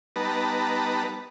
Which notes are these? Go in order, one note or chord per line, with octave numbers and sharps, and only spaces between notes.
G3 B3 D#4 B4 A5 A#5